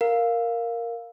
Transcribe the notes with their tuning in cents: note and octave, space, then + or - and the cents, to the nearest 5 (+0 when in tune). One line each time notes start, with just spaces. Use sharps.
A#4 +0 F5 +0